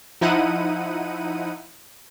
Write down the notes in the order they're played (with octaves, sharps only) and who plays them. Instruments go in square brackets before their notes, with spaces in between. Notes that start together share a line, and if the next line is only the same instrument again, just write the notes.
[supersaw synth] F3 D#4 E4 F#5 D#7